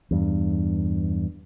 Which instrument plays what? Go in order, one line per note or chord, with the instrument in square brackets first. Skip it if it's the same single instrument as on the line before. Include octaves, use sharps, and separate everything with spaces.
[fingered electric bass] E2 G2